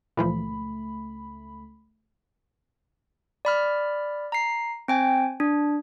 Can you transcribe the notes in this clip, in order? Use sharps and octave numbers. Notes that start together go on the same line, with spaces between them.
C#2 A#2 E3 F3 A3 B5
D5 B5 F6
A#5 C7
C4 G5 G#5
D4